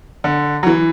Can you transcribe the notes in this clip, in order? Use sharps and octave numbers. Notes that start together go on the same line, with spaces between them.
D3
F#3
E3